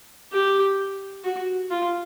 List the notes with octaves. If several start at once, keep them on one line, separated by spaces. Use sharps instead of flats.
G4
F#4
F4